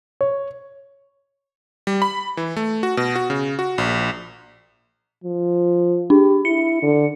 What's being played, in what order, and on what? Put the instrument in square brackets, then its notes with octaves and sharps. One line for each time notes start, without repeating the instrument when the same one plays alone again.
[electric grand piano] C#5
G3
B5
E3
A3
F#4
B2
F#4
C#3
F#4
A#1
[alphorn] F3
[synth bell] D4 [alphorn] G4
[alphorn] E4 [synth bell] C#7
[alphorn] D3